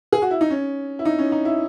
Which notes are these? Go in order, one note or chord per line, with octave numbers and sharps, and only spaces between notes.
G#4
F#4
E4
D#4
C#4
E4
D#4
C#4
D#4
E4